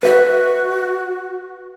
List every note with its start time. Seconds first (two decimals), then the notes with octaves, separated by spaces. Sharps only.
0.03 F#4 B4 E5